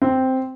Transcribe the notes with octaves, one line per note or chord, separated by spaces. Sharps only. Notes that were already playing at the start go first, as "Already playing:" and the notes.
C4